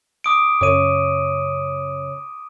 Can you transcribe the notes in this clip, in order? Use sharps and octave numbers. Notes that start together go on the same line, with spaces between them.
D6 D#6 D7
F#2 C#3 C#5 D6 D#7